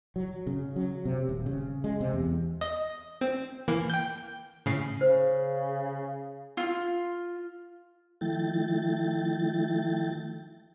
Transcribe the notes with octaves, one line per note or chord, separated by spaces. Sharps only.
F#3
C#3
F#3
C3
D#1
C#3
G#3
C3
E2
D#5
C4
E3 A#3
G5 G6
A2 C#3 C7
C#3 C5
F4
D#3 F3 A3 E4 G5 A6